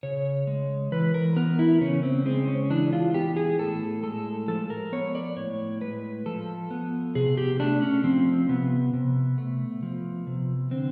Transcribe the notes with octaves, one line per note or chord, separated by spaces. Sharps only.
C#3 C#5
G#3
E3 B4
A#4
B3 A#4
E4
C#3 C#4
C4
G#3 C4
C#4
E3 D4
F4
B3 G4
G#4
A2 A4
G#3 A4
F3 A4
A#4
B3 C#5
D5
A2 C#5
G#3 B4
F3 A4
B3
C3 G#4
G4
A3 D4
C#4
F3 C4
C3 B3
C3
A3
F3
C3
D3 C4